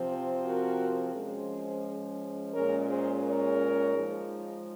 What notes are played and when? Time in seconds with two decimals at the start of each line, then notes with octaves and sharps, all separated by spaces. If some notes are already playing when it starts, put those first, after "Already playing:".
Already playing: C3 F3 C4
0.45 F#4 A#4
1.15 F3 G#3 C#4 G#4 C5
2.53 A#2 G#3 C#4 A#4 C#5
2.88 G#4 C5
3.23 A#4 C#5
3.92 F3 G#3 D#4